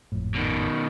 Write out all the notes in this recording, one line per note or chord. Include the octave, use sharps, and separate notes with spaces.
G#1 F2 A2
B2 D#3